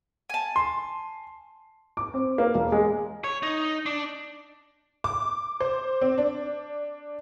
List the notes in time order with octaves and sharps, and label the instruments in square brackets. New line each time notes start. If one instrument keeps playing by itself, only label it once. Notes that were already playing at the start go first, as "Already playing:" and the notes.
[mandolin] G#5 A5
[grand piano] C6
[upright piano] D6
C4
A#3
E1
G#3
[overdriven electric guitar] C#5
D#4
D4
[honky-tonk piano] D6
C5
C4
D4